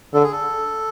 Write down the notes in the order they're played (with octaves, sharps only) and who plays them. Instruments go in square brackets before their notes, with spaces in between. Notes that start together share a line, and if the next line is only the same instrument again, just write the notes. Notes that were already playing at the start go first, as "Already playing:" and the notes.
[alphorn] D3 [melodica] A4
[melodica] G#4
A4